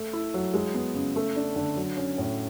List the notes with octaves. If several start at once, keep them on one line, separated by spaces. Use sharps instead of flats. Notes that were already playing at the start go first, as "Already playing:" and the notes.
Already playing: A3
E4
F#3
G#3
B3
C#3
A3
D4
D3
F#3
C#4
A2